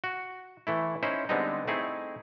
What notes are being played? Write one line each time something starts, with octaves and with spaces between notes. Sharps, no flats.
F#4
E3 A3 E4
C#4 D#4 E4 C5
D3 G3 G#3 B3 C4 D#4
A3 C4 D#4 E4 G#4